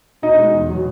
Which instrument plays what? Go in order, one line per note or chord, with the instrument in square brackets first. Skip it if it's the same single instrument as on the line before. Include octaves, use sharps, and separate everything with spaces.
[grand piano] B2 D#4 D#5
G#3
E2
B2 F#3